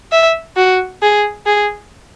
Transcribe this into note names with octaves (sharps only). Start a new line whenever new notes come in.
E5
F#4
G#4
G#4